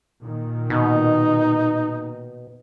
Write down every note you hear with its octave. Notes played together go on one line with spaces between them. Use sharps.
A#2 D#3
B2 D#4